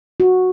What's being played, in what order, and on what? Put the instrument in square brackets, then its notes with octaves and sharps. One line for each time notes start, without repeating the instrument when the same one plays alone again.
[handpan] F#4